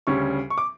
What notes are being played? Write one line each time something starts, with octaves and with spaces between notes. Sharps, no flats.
D2 C#3 G3 C#4 C#6
C#6
D6